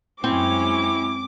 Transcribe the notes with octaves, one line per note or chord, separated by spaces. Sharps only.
F#2 G#3 C4 C#4 E4 D6